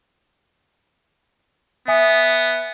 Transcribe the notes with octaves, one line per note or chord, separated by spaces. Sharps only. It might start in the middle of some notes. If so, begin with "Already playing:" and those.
B3 E5 G#5 D#6